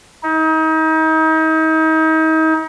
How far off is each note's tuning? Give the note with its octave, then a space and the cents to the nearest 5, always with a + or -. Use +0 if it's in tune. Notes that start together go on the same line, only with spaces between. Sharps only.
D#4 +35